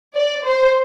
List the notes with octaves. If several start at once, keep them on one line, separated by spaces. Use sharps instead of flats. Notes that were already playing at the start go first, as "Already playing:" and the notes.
D5
C5